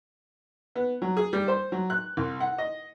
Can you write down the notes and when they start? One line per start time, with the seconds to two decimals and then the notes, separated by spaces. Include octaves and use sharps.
0.76 B3
1.02 F#3
1.17 G#4
1.33 G3
1.48 C5
1.72 F#3
1.90 F#6
2.17 C2
2.40 F#5
2.58 D#5